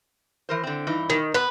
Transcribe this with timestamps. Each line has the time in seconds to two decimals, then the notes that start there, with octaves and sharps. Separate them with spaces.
0.49 E3 A#4 C5
0.63 D3 C4
0.87 G2 E3 D#4
1.10 D#3
1.34 B3 B4